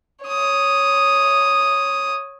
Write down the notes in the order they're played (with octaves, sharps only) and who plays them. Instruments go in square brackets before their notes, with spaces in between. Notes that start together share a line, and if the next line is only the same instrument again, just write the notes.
[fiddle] C#5 D#6